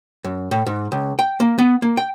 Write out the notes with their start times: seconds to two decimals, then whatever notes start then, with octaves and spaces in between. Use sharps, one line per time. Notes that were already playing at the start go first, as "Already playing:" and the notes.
0.24 F#2
0.51 A2
0.66 G#2
0.92 C#2
1.19 G5
1.40 A#3
1.58 B3
1.82 A#3
1.97 G5